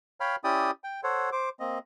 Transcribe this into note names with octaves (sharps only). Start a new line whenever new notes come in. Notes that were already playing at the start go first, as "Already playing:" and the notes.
C#5 F5 G5 B5 F6
C#4 E4 G4 D5 G5 D#6
G5
A4 C5 C#5 F#5
C5 D6
A#3 C4 D#5